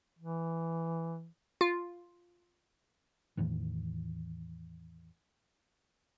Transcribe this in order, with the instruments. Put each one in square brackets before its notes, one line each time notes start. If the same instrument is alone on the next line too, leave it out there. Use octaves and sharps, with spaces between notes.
[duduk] E3
[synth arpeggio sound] F4
[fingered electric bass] E2 A2 D#3 E3